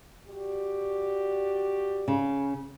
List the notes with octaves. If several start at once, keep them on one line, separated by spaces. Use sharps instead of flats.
F#4 G4 D5
C#3